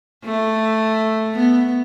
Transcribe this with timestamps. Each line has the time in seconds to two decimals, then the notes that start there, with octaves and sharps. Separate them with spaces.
0.25 A3
1.34 B3